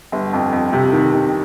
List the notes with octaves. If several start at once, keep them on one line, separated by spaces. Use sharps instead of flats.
G1
F2
F2
C3
D#3
C3